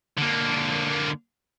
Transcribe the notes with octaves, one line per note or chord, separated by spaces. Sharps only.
D3 A#3